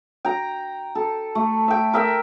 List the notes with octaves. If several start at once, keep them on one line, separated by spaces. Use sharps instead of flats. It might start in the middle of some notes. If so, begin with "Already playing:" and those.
G5 A#5
A4
A3
E5 G5
A#4 E5 G5